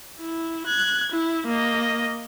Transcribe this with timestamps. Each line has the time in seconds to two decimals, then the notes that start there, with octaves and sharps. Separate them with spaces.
0.21 E4
0.67 F#6 G#6
1.13 E4
1.47 A#3 D#5